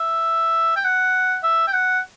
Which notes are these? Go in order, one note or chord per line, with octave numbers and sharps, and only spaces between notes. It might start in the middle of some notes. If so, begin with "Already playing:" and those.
Already playing: E5
G5
F#5
E5
G5
F#5